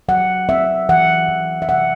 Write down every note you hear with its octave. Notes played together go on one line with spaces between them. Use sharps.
F#3 F#5
C4 E5
E3 F#5
E3
E5
C3 F#5